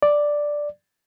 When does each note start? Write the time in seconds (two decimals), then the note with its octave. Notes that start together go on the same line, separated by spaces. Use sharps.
0.03 D5